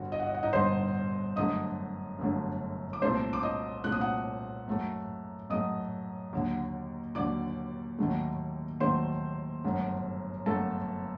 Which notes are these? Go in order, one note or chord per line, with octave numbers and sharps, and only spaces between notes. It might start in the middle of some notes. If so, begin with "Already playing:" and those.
Already playing: G1 G2 D3 G3 F#4
D#5
F#5
D#5
F#5
D#4 D#5
G1 G2 D3 G3 C5 C6
G1 F#2 D3 A3 D#5 D#6
G1 F#2 D3 A3
D6
C2 A#2 A3 C5 C6
D6
D#5 D#6
C2 A#2 A3 F#6
D#6
F#5 F#6
F#2 F#3 A3
F#2 F#3 A3 D#5 D#6
D#2 D3 F#3
D#2 D3 F#3 D5 D6
D#2 D#3 F#3 A3
D#2 D#3 F#3 A3 C5 C6
G1 F#2 F#3 A3
G1 F#2 F#3 A3 A4 A5